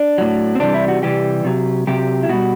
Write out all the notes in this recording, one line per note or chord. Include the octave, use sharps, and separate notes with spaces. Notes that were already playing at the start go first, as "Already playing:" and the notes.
Already playing: D4
A2 F#3
C4
C3 E3 G3 D4
E4
F#4
C3 E3 G3 G4
C3 F#3
C3 F#3 G4
E4
B2 G3 F#4